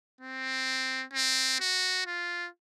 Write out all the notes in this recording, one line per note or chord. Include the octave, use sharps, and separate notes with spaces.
C4
C4
F#4
F4